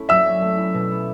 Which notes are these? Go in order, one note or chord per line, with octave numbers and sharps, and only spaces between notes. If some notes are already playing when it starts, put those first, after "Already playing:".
Already playing: A3 C#4 E4
F#3 E5 E6
C#4
A3
E4
B2
B3